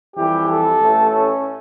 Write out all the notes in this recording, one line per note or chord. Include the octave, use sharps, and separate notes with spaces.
F2 E3 G3 G4
A4
A1 A2 E3 A3
C#4